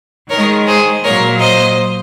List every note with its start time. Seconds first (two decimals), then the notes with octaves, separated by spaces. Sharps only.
0.30 D#3 G#3 A#4 C#5
0.67 G#4 C5
1.03 A#2 F#3 A#3 A#4 C#5
1.41 C5 D#5